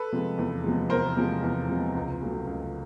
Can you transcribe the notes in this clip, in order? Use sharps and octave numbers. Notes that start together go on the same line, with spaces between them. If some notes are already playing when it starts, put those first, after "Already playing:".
Already playing: A4 B4
C3 F3 G#3
E2
C3 F3 G#3
E2 A#4 C5
C3 F3 G#3
E2
C3 F3 G#3
C#2
C#3 F#3 A3
C#2